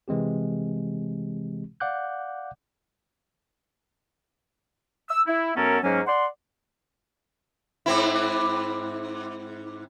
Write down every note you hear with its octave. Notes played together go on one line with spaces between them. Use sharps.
C3 E3 G#3 C4 G4
D5 F5 F#5 D6 F#6 G6
E6
E4
F#2 B3 C#4 A4 A#4
G#2 F#3 A#3 C#4
D5 F#5 C6
G#2 C4 E4